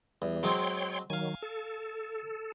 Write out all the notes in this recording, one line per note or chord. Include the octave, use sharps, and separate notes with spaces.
E2 G3
F#3 G#3 C4 C#5 G5 C6
D#3 F#3 F5 G#5
A4